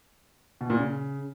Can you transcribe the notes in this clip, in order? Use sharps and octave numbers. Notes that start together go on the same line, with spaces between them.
B2
A#2
C#3